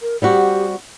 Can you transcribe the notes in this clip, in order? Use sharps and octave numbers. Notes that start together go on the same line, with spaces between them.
A#4
G3 C4 F#4 G4